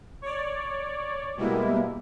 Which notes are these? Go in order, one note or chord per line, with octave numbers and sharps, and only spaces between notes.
C#5 D5
B2 G3 G#3 A#3 E4